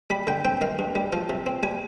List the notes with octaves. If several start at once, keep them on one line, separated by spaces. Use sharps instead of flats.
G3 B5
D3 G5
C4 G5
D#3 F5
G2
G3
F3 F5
C3
C4
G3 G#5